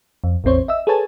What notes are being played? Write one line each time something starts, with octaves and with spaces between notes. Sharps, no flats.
F2
A1 E2 C4 C5 C#5
D#5 E5 E6
G#4 A4 B4 C#5 G#5 A5